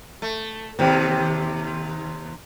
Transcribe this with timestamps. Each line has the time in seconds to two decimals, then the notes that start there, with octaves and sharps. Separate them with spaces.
0.22 A3
0.79 D#2 C3 C4 G4